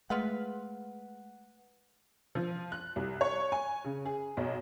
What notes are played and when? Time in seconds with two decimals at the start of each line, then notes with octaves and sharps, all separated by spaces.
0.10 G#3 A3 B3 F4 B4 F#5
2.35 F3
2.72 F#6
2.96 C2
3.21 C#5
3.52 G#5
3.85 C#3
4.05 G#4
4.37 B1